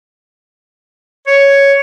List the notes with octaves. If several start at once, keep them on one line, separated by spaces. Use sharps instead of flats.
C#5